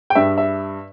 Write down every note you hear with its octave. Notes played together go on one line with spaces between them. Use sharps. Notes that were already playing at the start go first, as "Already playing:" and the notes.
G5
G2 G3 D4 E5
E5